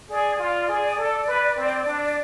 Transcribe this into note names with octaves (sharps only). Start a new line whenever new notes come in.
G#4 D5
F4
G#4
A4
B4
C4
D4